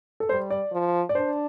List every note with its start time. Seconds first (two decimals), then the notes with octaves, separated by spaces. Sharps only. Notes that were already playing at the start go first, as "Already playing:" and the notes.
0.20 A4
0.29 G3 C5
0.50 D5
0.72 F3
1.09 D5
1.15 D4 C5